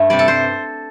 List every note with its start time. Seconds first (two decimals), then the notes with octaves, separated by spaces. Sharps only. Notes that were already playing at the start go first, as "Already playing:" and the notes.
Already playing: G2 A3
0.10 C3 G3 D5
0.19 A4
0.28 C5